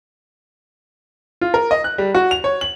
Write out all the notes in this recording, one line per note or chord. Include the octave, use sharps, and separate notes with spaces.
F4
A#4
D#5
F#6
G3
F#4
F7
C#5
F#7